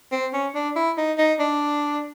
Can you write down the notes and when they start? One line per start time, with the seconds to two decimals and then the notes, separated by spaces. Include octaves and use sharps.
0.12 C4
0.33 C#4
0.55 D4
0.76 E4
0.98 D#4
1.18 D#4
1.40 D4